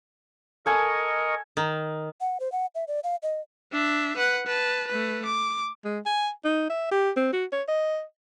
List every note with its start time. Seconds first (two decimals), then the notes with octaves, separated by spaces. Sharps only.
0.66 A4 A#4 D#5 G#5 A5 C#6
1.57 D#3
2.21 F#5
2.40 C5
2.52 F#5
2.75 E5
2.88 D5
3.04 F5
3.23 D#5
3.72 D4 E5
4.17 B4 F#5
4.47 B4 A5
4.88 A3 B4
5.25 D6
5.85 G#3
6.06 G#5
6.45 D#4
6.70 E5
6.92 G4
7.17 C4
7.33 F#4
7.53 C#5
7.68 D#5